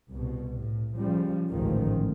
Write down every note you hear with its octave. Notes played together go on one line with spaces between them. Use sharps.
C2 B2
A2
C#3 F3 G3
A1 D2 G#2 D#3 F3